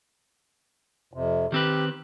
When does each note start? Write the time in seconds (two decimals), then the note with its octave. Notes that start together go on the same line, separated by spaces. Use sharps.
1.13 F2 C3
1.52 D#3 C4 G4 B4